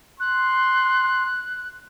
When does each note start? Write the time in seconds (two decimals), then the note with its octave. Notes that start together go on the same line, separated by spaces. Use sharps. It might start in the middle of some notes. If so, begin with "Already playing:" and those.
0.20 C6 F#6